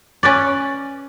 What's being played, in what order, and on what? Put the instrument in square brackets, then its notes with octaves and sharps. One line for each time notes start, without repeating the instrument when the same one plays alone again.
[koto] C#4 B4 D5